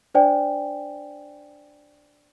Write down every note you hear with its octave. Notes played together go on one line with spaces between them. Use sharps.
D4 C5 D5 G5 G#5